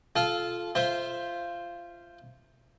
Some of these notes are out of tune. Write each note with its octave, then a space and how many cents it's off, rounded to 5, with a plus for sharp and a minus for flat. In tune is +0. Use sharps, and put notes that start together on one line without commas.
F4 +0 A4 -20 F5 +0
F4 -15 C5 +0 E5 +0